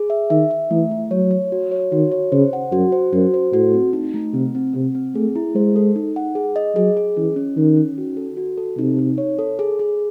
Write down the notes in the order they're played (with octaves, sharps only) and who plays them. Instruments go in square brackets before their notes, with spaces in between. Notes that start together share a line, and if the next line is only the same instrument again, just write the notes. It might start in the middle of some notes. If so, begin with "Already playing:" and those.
Already playing: [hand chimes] G#4
E5
[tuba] D#3 [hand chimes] E5
[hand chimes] E5
[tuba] E3 [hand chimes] A3
[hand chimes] A3
[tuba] F#3 [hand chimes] C#5
[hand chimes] C#5
F#4
C#5
[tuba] D#3 [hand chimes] F#4
[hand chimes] C#5
[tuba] C#3 [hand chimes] C5
[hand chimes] F#5
[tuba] F#2 [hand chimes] F#4
[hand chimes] C5
[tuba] F#2 [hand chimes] F#4
[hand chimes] C5
[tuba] A2 [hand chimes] F#4
[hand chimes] C4
D#4
A3
[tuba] C3 [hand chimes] C4
[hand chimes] C4
[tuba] C3 [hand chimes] C4
[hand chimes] C4
[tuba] A3 [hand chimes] G#4
[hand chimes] E4
[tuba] G#3 [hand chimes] C5
[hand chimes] A4
D#4
F#5
G#4
D#5
[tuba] F#3 [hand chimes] G#4
[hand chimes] G#4
[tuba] E3 [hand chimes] C#4
[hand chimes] C#4
[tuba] D#3 [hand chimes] C#4
[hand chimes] C#4
F#4
A4
F#4
A4
[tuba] C3 [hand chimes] D#4
[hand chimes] D#4
C#5
A4
G#4
G#4